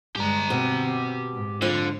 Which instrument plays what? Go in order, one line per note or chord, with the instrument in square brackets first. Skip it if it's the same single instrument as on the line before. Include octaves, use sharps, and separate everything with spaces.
[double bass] G2 G#3 [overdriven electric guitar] G4 A#5
[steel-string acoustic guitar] B2 [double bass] C4
[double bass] G#2
[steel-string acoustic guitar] F2 F4 [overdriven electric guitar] D3